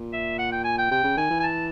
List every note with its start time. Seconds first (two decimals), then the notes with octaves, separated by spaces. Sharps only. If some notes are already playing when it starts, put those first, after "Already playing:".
Already playing: A#2
0.13 E5
0.38 F#5
0.52 G5
0.64 G#5
0.78 G5
0.91 C3 G5
1.04 C#3
1.17 D#3 G#5
1.30 E3
1.40 G#5
1.43 A5